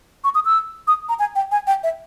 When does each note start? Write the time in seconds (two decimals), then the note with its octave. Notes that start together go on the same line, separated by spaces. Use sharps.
0.24 C#6
0.35 D#6
0.45 E6
0.87 D#6
1.09 A#5
1.19 G#5
1.35 G5
1.51 G#5
1.67 G5
1.83 E5